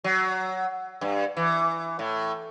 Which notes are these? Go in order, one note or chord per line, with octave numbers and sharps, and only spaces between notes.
F#3
G2
E3
A2